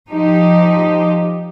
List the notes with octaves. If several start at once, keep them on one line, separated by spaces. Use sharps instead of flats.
F3 D#4 G4